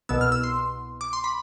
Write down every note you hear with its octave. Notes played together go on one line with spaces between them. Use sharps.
C2 B2 B3 E6
F6
E6
C6
D6
C6
B5